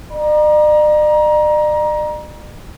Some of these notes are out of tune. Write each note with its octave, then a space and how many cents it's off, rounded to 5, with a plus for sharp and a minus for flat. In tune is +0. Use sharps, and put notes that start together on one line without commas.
D5 +45 A#5 +25